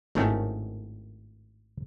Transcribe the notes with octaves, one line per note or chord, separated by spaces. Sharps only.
G#1 A2 D#3 A3 C#4